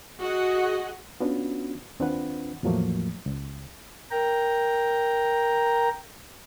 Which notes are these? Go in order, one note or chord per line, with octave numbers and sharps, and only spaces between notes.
F#4 G#4 D#5 F#5
B3 C#4 D4 F4 F#4 B4
D#2 C4 D4 F4 B4 F#5
E2 A2 F3 F#3 A3 A#3
C#2
A#4 G5 A#5